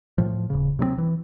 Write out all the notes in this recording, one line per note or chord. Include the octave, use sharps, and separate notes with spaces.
A2 F3
D#1 C#3
C3 F#3 G#3 C4
E3